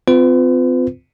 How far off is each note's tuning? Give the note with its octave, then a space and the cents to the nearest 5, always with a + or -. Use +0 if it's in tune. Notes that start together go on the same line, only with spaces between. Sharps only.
C4 -35 F4 +0 B4 +40